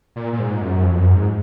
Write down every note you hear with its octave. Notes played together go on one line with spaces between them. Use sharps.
A#2
A#2
G#2
F#2
F2
F#2
G#2